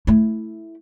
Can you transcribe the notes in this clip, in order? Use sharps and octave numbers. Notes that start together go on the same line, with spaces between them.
A3 E4